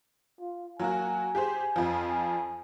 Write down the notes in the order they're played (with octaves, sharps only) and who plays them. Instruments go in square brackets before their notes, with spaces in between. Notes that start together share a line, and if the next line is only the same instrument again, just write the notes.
[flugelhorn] F4
[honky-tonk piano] F#3 A#3 F#4 [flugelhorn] G#5
[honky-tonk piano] G4 G#4 C5
F2 F3
[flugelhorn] G#5